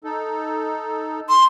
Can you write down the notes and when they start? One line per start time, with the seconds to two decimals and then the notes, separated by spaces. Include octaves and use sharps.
0.04 D#4 A4
1.29 C6